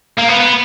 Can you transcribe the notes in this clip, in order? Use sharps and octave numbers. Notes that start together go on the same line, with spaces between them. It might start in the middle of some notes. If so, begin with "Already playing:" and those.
A#3
B3
B3